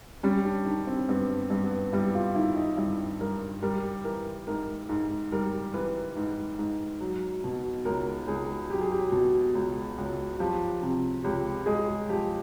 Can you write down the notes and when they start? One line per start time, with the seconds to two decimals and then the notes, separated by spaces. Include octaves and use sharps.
0.23 G3 C#4
0.45 D4
0.65 D#3 D4
0.87 C4
1.09 G2 B3
1.50 G2
1.64 B3
1.92 G3 E4
2.14 F4
2.35 D#3 E4
2.56 D#4
2.77 G2 E4
3.20 G2 A#4
3.62 G3 A#4
4.05 E3 A#4
4.47 G#2 A#4
4.89 G#2
5.32 G3 A#4
5.74 E3 B4
6.16 G#2
6.59 G#2
7.00 F#3
7.44 B2
7.85 C#2 A#4
8.27 C#2 G#4
8.70 F#3 G4
8.81 G#4
8.91 G4
9.12 B2
9.55 C#2
9.98 C#2
10.39 F3 G4
10.82 C3
11.24 C#2 G4
11.66 G#3 G#4
12.09 F3 G4